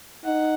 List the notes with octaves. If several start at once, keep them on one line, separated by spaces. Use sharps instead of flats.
D#4 F#5